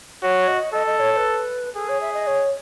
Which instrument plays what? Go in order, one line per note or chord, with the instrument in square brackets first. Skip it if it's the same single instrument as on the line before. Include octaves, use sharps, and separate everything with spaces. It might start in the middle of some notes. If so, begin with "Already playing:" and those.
[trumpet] F#4 [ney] C#5
[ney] D#5
[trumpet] A4 [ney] D#5
[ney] D#5
C#5
C#5
B4
[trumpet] G#4 [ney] A4
[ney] C#5
E5
D#5
C#5